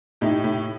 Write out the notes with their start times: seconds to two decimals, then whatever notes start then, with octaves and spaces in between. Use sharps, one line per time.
0.21 A2 D#4 G4
0.44 A2